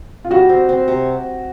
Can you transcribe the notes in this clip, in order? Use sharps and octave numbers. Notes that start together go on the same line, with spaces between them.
F4
G3 F#4
C4
C4
C3